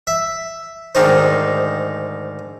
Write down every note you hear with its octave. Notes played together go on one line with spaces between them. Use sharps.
E5
D2 G#2 D#3 D#4 C5